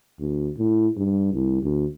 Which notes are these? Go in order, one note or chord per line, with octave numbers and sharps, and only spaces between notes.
D2
A2
G2
C2
D2